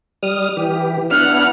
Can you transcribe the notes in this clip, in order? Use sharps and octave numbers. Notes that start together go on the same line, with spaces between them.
G3 D#6 F6
E3 G4
B3 D4 E4 F#5 F6